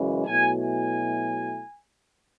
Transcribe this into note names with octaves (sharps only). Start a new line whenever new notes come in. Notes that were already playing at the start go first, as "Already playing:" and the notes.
Already playing: F#2 C#3 E3 G#3
B2 F#3 A3 E4 G#5
G#5